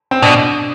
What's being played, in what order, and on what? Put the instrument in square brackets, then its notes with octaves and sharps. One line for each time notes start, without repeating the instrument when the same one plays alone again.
[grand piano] C4
[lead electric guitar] B2 [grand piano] D4